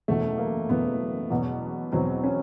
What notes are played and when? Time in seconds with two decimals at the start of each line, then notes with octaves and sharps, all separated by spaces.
0.08 F#1 E2 B2 A3
0.38 A#3
0.69 F#1 E2 B2 B3
1.31 E2 B2 F#3
1.92 E2 B2 F#3 C4
2.23 C#4